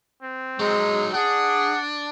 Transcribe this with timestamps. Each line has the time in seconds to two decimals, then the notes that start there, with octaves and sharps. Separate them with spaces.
0.22 C4
0.60 F#3 G#3 D#4
1.14 D4 G#4 F#5